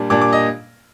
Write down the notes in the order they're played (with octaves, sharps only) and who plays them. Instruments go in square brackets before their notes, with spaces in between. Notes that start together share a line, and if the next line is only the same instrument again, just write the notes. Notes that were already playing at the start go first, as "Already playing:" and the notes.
Already playing: [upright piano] A#2 G3 D4
A#2 G3 D4 D6
D6
D#5